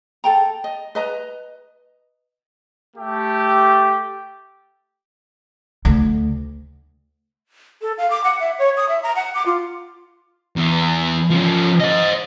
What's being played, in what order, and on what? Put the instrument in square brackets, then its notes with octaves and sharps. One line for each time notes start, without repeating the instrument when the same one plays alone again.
[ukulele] A4 G5 A#5
D#5
B4 D#5 A#5
[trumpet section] A3 G4
[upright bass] D2
[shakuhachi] A4
F5
D6
F#5
E5
C#5
D#6
E5
A#5
F#5
D6
F4
[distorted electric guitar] E2
F3 C#4
C5 D#5